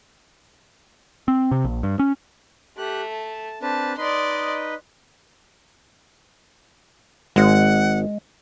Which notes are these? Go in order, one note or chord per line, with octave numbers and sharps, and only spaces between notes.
C4
C3
A#1
G2
C#4
A3 G4 F#6
A5
C4 D4 B4 A5
D#4 B4 D5 D#5 C6
G#1 G#3 F#5